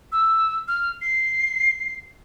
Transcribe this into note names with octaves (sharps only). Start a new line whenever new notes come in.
E6
F6
C7